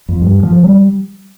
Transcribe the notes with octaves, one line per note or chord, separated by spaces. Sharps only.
F2
G2
F3
G3